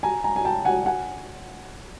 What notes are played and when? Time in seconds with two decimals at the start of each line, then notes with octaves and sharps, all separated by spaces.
0.03 G#5 A#5
0.24 G#5 A#5
0.36 G#5
0.45 G5 A5
0.65 F#5 G#5
0.86 F#5 G#5